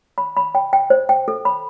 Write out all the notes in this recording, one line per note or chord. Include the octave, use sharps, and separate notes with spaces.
B5
B5
G5
G5
C5
G5
A4
B5